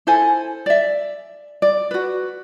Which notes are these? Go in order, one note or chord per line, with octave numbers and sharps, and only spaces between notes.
E4 A4 C5 G#5
D5 E5
D5
F#4 B4